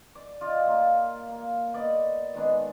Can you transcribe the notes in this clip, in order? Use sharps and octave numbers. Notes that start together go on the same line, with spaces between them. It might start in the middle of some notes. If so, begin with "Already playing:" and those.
D5
F4 D5 D#5
A#3 F4
A#3
B3 D5 D#5
D#3 G#3 B3 D4